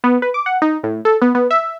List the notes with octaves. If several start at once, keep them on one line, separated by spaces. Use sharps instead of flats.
B3
B4
D6
F#5
D#4
A2
A4
B3
B3
E5